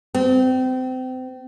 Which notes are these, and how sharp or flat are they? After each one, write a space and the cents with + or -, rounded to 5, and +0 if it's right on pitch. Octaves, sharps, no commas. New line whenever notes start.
C4 -30